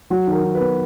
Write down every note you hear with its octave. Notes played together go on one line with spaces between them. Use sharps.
F#3 F#4
D#3
A#4
D#3
B4
B3